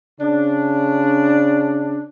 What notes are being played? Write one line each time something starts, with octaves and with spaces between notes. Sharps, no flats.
C#3 D4